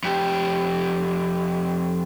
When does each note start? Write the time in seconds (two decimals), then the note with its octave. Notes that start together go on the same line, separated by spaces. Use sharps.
0.04 F2 G4